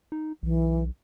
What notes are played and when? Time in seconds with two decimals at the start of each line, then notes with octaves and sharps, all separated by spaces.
0.12 D#4
0.43 B1 E3